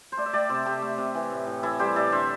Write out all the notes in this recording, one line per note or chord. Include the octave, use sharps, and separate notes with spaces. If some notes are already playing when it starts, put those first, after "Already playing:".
C5
A3 D5
E5
A3 D5 G5
C3 C5 E5
A3 G4 C5
A3
C3
E3
A2
A2
E3 E4 A4
G3 G4 C5
A2 A4 D5
D3 C5 E5